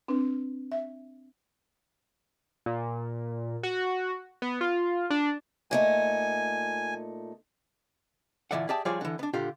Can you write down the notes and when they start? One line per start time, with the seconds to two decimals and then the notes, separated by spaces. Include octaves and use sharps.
0.08 C4 D4 B4
0.72 E5
2.66 A#2
3.63 F#4
4.42 B3
4.61 F4
5.10 D4
5.71 A#2 A3 D#4 G#5
8.51 D2 A#2 E3 D5 E5 F#5
8.69 G4 G#4 D5 E5 G5 A5
8.85 F3 G3 F4 G#4 C#5 D5
9.01 D3 E3
9.19 B3 D4
9.33 A#2 D3 F4 G4